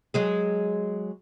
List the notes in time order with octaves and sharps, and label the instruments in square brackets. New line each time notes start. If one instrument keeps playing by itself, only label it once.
[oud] F#3 G#3 G#4